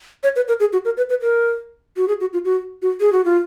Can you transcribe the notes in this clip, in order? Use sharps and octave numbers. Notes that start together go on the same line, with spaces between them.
C#5
B4
A#4
G#4
F#4
A#4
B4
B4
A#4
F#4
G#4
F#4
F4
F#4
F#4
G#4
F#4
F4